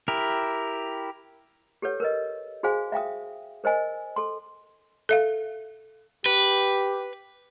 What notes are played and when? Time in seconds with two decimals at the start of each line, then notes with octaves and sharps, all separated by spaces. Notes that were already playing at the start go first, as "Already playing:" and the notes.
0.08 E4 G4 A#4
1.82 G4 A4 B4 C#5
2.00 A#4 B4 D#5
2.63 F#4 G#4 C5 F5 G#5
2.92 E5 F5 G5 D#6
3.64 A#4 C5 D#5 G#5
4.16 A4 C6
5.09 A4 E5 F5
6.26 G4 B4